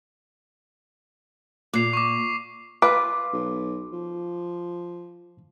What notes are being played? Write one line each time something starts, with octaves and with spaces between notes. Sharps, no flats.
A#2 D6 C7 F7
C#6 D6
F4 B4 D6
B1
F3